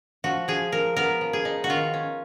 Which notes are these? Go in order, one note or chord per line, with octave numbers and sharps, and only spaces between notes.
F3 F#4
F3 G#4
F3 A#4
B3 A#4
F3
G#4
D#4
F#4
D#3 F4
C#4